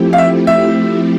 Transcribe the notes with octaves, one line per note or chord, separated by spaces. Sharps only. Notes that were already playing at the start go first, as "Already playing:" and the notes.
Already playing: F3 A3 C4 E4 G4
F5
E5
E5